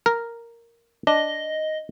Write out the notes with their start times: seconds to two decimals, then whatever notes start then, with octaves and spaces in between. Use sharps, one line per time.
0.06 A#4
1.07 D4 D#5